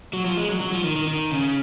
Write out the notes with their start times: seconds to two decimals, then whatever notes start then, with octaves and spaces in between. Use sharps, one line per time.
0.13 F#3
0.25 F3
0.37 G#3
0.49 F#3
0.61 F#3
0.72 F3
0.84 D#3
0.96 D#3
1.07 D#3
1.31 C#3